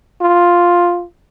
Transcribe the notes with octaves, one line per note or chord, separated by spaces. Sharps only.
F4